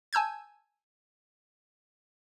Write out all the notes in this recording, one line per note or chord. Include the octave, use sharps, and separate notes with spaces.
G#5 A5 E6 G6 G#6